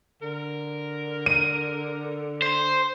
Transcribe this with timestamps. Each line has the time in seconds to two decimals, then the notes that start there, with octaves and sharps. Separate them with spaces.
0.22 D3 A#4
1.26 D#7
2.42 C5